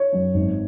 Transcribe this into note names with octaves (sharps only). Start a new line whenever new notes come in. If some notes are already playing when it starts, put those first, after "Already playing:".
Already playing: C#5
F#2
G#1